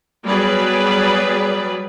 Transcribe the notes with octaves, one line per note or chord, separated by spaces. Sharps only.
F#3 G3 B3 G#4 B4 D5